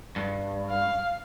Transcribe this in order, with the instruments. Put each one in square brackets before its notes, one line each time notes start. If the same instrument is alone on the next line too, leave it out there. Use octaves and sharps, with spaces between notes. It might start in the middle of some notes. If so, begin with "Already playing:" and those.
[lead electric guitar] G2
[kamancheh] F5